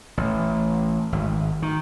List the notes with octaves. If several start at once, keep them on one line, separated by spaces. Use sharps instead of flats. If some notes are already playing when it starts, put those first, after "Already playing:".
A1
G#1
D#3